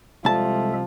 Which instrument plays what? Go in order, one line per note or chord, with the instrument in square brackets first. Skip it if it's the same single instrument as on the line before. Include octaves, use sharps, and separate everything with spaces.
[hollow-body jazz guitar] C2 A5 [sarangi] F3 [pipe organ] G#3 A4 E5